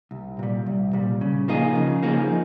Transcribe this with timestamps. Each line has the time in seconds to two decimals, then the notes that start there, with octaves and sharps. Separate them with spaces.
0.11 C2
0.39 A#2 G3
0.66 C2
0.93 A#2 G3
1.21 C#3
1.48 F3 A#3 D#4 G#4
1.75 C#3
2.03 F3 A#3 D#4 G#4